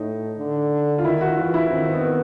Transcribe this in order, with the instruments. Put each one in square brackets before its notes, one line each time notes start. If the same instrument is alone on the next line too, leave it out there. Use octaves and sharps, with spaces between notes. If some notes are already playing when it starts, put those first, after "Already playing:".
Already playing: [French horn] A2 [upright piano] D#4
[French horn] D3
[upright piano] F4
[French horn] D#3 [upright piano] E4
[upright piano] F#4
[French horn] E3 [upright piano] F4
[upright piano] E4
[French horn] D#3 [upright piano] C4
[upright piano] B3